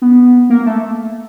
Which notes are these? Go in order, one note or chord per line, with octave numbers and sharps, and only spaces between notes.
B3
A#3
A3